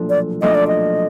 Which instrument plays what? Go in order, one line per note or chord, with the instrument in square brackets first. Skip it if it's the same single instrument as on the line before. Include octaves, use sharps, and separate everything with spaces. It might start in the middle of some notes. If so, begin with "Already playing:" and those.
Already playing: [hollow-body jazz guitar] B1 A#2 F3 A3 D4
[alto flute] D5
[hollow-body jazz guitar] B1 A#2 F3 A3 D4 [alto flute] D#5
[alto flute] D5
D#5